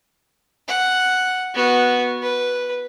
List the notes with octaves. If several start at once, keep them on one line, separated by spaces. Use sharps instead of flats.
F#5
B3 F#4
B4